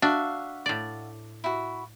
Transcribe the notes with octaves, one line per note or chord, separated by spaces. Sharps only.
D4 F#4 E5 F5
A2 D5
E4 F#4